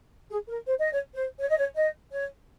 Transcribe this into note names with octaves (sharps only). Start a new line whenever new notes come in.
G#4
A#4
C5
D#5
C#5
C5
C#5
D#5
C#5
D#5
C#5